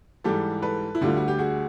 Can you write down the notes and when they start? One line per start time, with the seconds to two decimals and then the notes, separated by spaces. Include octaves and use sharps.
0.24 G#2 E3 G3 G4 A4
0.62 A4 B4
0.95 E4
1.01 D2 D3 G3 F4
1.17 F#4
1.28 G4
1.39 F#4 G#4